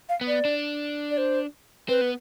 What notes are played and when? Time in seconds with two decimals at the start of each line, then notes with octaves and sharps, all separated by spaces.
0.09 F5
0.21 B3
0.27 D5
0.45 D4
1.11 D5
1.18 C5
1.89 C4 B4
2.01 B3